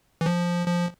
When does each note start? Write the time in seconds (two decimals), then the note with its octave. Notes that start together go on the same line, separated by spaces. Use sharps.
0.21 E3
0.26 F3
0.68 F3